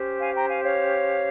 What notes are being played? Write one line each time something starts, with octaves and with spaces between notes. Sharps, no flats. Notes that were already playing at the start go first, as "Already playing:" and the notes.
Already playing: C#4 G4 C5
F5 G#5
G5 A#5
F5 G#5
C#5 F5